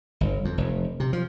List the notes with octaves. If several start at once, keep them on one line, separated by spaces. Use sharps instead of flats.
G1
F2
F1
C3
F3